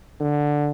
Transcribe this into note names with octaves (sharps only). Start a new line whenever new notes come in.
D3